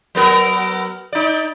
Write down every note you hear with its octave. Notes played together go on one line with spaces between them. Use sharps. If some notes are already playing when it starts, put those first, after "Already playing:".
F#3 B3 A#4
D#4 D5